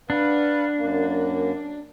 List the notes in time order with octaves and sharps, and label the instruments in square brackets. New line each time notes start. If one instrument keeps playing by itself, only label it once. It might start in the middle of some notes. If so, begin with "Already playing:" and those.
[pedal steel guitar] D4 [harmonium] B4 F5 F#5
[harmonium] F#2 A#3